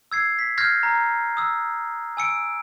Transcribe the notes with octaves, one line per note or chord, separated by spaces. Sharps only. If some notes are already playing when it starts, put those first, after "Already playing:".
E6 G#6 C7
B6
F6 G6 G#6 A#6 C7
A#5
D#6 E6
G#5 E6 C#7 D7